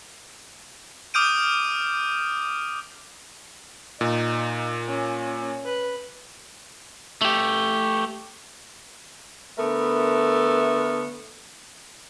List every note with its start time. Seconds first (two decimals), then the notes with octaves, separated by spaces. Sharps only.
1.14 D6 D#6 F6 G6 D7 D#7
4.01 A#2 D#4
4.88 C#4
5.65 B4
7.22 A3 G4
9.58 D3 A3 B3 A#4